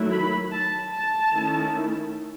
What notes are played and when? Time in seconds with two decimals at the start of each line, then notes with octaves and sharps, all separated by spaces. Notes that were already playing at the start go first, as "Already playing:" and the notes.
Already playing: D#3 F#3 A3 E4
0.12 B5
0.52 A5
0.92 A5
1.34 D#3 A3 C#4 E4